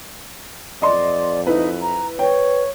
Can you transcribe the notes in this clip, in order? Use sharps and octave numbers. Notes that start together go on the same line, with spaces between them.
F2 D5 D#5 C6
D#4 E4 B4
A#5
B4 C#5 G5